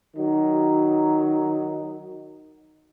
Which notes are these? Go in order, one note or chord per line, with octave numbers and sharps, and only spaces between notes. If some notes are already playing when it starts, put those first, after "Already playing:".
D#3 F#3 D#4